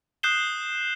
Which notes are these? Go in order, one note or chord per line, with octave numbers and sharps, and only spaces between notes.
D#6 F#6 G6 C7 E7 G7